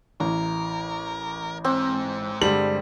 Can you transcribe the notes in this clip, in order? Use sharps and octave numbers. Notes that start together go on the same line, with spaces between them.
A1 E3 A#4
G#2 C4
G2 D3 G3 G#3 F#7